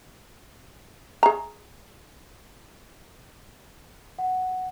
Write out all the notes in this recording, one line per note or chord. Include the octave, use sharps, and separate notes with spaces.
G#4 A#5
F#5